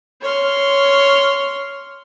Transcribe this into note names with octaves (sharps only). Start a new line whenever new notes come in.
C#5 C6 F6